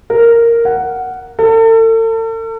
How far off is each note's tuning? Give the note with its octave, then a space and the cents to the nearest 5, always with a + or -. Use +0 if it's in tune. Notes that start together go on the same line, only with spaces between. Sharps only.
A#4 -5
F#5 +5
A4 +40